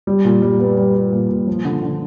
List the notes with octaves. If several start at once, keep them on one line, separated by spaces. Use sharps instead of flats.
G3
A#2
G3
B3
G3
G3
A#2
A#2
F3
D3
D3